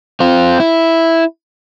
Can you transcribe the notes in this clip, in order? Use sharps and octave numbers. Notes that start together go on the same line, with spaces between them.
C4 F4
E4